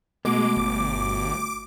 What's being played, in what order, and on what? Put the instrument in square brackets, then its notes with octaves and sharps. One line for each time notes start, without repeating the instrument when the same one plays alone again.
[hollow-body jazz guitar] B2 [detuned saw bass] G#3 [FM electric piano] A3 F#4 [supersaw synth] D6
[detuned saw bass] G1